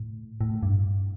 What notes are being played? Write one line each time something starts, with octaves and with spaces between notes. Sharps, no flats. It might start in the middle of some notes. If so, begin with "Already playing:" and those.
Already playing: A2
A2
G2